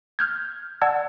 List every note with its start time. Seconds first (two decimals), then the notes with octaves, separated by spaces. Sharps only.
0.19 F6 G6 G#6
0.82 D5 F#5 A5 E6 G#6